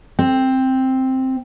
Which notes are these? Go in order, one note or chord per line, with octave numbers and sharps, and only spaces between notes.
C4